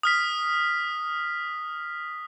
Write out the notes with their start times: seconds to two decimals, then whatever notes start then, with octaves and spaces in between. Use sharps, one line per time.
0.03 D#6 F6 B6